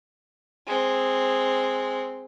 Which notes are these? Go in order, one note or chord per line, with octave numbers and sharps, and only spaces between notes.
G#3 C4